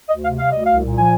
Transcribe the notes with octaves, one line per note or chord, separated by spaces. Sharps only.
D2 D#5
C3 F5
G3 F5
D2 D#5
C2 F5
A#2
F3 G#5